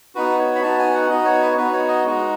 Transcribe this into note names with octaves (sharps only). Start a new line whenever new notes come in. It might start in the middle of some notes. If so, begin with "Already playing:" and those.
B3 D#4 F#4 B4
C#5
B5
B3 D#4 F#4 A5
G#5
F#5
B3 D#4 F#4 D#5
C#5
B4
C#5
B3 D#4 F#4 B4
C#5
D#5
G#3 D#4 F#4